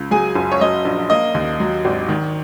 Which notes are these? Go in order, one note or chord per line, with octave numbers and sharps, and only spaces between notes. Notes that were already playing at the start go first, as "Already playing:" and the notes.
Already playing: C#2
F#3 G#4 G#5
F#1
C#5
F#3 D#5
A#1
A#3 D#5
D#2
F#3
G#1
D#3